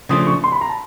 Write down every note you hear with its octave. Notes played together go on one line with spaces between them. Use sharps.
C#3 F3 A3 D4 D#6
C#6
C6
B5
A#5
A5